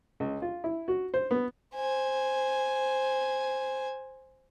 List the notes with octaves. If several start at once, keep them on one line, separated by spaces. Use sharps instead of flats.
C#2
F4
E4
F#4
C5
B3
C5 G#5